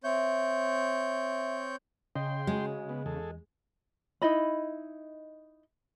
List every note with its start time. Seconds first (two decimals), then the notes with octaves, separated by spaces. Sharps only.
0.04 C4 C#5 E5 G6
2.15 C#3 D#5 G5 C6
2.47 G#3 F#4
2.89 B3
3.06 E2 G#4 A4
4.22 D#4 E4 D#5 B5